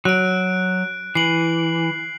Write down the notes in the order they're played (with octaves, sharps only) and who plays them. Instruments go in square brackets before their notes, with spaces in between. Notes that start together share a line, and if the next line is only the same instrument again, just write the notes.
[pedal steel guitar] F#3 [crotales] F#6 D7
[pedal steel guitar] E3 [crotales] C7 F#7